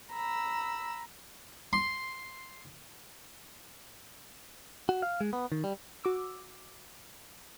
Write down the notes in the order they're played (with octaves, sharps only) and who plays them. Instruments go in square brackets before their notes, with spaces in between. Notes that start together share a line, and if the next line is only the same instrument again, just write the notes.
[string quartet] A#5 B5 E6
[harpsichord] C6
[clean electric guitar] F#4
F5
G#3
B3
D#3
G3
[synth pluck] F#4 D6 E6